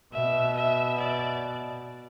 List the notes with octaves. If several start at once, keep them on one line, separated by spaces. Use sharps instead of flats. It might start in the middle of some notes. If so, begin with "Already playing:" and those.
B2 E5
E5
D5